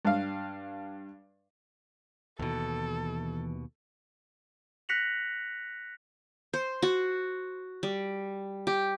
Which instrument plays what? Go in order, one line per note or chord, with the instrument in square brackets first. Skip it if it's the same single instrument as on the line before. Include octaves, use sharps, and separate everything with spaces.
[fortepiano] G2 F5
[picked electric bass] D#2 B2 [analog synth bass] E3 [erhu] A4
[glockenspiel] F#6 A#6 B6 C#7 F7 F#7
[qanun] C5
F#4
G3
G4